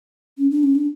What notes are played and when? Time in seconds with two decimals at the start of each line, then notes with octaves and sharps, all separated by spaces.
0.38 C#4
0.50 D4
0.63 C#4
0.75 D4